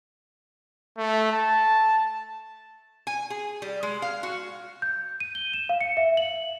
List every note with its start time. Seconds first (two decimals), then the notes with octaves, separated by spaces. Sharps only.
0.98 A3
1.33 A5
3.07 G#5
3.30 G#4
3.62 G3
3.83 G#3
4.02 F5
4.23 F#4
4.82 G6
5.20 D#7
5.35 G7
5.53 E7
5.69 F5
5.81 C#7
5.97 E5
6.17 F#7